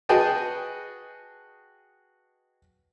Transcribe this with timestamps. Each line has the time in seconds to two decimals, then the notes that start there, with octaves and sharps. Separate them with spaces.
0.09 F#4 G#4 B4 D#5 G5 A5